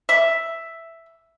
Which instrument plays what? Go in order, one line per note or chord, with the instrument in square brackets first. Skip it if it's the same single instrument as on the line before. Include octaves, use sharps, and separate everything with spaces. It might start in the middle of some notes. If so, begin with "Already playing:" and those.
[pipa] E5